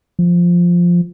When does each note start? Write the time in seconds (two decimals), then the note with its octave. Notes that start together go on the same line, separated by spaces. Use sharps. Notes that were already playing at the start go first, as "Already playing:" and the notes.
0.19 F3